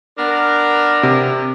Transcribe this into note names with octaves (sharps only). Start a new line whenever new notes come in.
B3 D4 A#4
C3